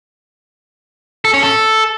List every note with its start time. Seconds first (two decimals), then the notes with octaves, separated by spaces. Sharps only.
1.25 A4
1.34 C#4
1.43 A4